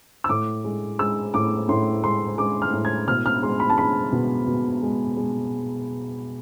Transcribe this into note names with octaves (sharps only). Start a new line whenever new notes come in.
E6
A2 D6
G#3
G#3 E6
A2 D6
A2 C6
G#3 C6
G#3 D6
F6
A2
G#6
B2 F6
F6
G#3 C6
B5
A5
G#3 B5
B2
B2
G#3
G#3